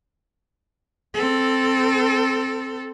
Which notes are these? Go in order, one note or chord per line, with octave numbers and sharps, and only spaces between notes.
C4 A4